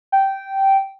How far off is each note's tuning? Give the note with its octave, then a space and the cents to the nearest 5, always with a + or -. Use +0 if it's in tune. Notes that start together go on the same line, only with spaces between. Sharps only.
G5 -10